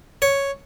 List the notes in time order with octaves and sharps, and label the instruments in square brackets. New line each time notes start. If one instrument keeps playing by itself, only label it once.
[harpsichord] C#5